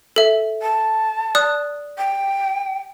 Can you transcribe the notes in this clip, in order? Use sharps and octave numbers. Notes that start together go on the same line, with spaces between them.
A4 E5
A5
D5 D#6 F#6
G5